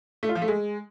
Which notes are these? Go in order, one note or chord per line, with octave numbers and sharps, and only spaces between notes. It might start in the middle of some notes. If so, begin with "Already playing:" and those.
A3
F4
F3
A3
G#3